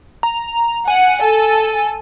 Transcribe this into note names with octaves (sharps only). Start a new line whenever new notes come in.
A#5
F#5 G#5
A4